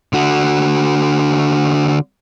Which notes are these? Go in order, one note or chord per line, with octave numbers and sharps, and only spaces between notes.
D3 F#4